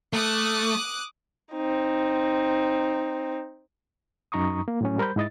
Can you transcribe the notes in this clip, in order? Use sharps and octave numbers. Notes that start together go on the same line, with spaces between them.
A3 D6 D#6 F#6
C4 D#4
F#2 D#4 A#5 C#6 D#6
A#3
A2 F#3 C#4
G3 A#4 C5 B5 G6
G#2 E4 D#5 A6